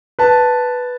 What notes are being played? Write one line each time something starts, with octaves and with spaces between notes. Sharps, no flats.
B4 A5